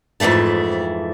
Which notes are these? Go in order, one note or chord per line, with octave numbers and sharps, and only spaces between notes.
F2 G#2 E3 A3 A5